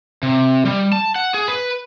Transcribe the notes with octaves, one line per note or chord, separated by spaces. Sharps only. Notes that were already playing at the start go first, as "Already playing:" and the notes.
C3
G3
A5
F#5
G#4
B4